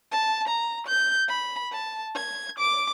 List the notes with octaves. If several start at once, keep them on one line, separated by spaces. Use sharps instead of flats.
A5
A#5
G6
B5
A5
G#6
D6